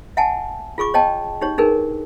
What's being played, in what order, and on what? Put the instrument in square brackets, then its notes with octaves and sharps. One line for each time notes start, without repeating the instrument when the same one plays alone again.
[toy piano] E5 F#5 G#5 A5
F4 G#4 C#6 D6
C#5 D#5 G5 A5
D#4 G4 C#5
D4 D#4 G#4 A#4 B4